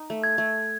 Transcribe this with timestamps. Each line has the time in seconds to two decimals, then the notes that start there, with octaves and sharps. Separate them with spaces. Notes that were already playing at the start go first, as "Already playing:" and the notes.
Already playing: D#4
0.10 A3
0.24 G#6
0.38 A3